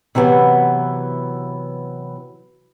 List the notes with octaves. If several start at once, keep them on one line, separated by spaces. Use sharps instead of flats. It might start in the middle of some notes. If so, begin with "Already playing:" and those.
C3 E3 F#3 B3